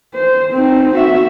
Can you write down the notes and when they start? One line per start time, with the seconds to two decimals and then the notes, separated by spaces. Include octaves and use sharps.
0.15 C5
0.52 C4 D#4
0.95 F#4 E5